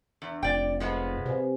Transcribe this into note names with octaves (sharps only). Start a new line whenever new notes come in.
E2 D4
F1 D5 G5
F3 G#3 B3 G#4 A4
C3 B4 C5 G#5